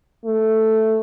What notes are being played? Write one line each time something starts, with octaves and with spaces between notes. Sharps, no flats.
A3